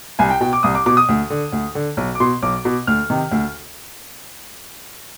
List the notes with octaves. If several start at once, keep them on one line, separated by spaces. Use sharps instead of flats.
C2 G#5
G5
B2 G5
D6
C2 D#6
D6
B2 D6
D#6
D2
D3
D2
D3
B1
D6
B2 C6
B1 D6
B2
D2 F6
C3 D#3
D2